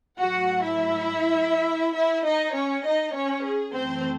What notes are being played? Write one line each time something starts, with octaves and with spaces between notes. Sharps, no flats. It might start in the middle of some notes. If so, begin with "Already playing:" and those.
G#2 F#3 A3 F#4 F#5
E4 E5
E4 E5
D#4 D#5
C#4 C#5
D#4 D#5
C#4 C#5
G#4
F#2 E3 A3 C4 C5